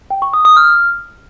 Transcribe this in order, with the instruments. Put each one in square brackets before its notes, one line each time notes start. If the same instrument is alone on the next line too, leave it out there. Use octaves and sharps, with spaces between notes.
[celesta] G5
C#6
D#6
D#6
F6